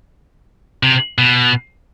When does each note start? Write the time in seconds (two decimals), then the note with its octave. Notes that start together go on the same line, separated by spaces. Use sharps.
0.83 C3
1.18 B2